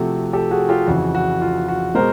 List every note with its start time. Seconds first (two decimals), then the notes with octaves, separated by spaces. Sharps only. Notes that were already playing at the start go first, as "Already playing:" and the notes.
Already playing: C3 F3 A3 F#4
0.33 G4 A4
0.51 F#4 G#4
0.69 F4 G4
0.87 F2 C#3 E3 F#4
1.15 F#4
1.41 F4
1.68 F#4
1.95 B2 G#3 A#4 C5